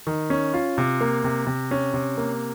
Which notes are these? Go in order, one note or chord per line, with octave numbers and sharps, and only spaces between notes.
D#3
C#4
F4
C3
A#3
C3
C3
C#4
C3
A#3